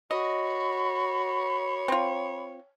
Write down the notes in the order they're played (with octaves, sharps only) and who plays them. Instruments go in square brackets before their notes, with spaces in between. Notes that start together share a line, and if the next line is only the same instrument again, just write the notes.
[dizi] F#4 [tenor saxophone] C#5 [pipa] D#5 [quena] B5
[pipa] C4 F4